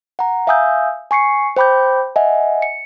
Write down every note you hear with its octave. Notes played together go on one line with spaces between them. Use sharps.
F#5 A#5
E5 F5 G#5 D#6 E6 G6
G#5 C#6 C7 C#7
C5 G5 B5 D6 G6
D#5 E5 F#5 G#5
C#7